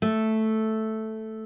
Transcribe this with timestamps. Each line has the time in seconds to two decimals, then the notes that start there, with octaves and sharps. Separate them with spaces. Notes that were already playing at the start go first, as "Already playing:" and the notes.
0.02 A3